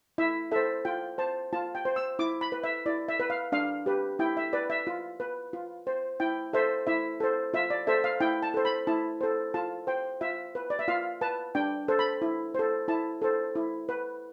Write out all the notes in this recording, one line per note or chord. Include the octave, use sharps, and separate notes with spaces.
E4 E5
A4 C5 E5
F4 G5
C5 A5
F4 A5
G5
C5
E6
E4 D6
B5
B4
E5
E4 D5
E5
B4
F5
D4 F5
G4 B4
E4 G5
E5
B4 D5
E5
F4
B4
F4
C5
E4 G5
A4 C5 E5
E4 E5
A4 C5
F4 E5
D5
A4 C5 E5
F5
E4 G5
A5
A4 C5
B5
E4 A5
A4 C5
F4 A5
C5 G5
F4 E5
B4
D5
E5
F4 F5
B4 A5
D4 G5
A4 C5
B5
E4
A4 C5
E4 A5
A4 C5
E4
B4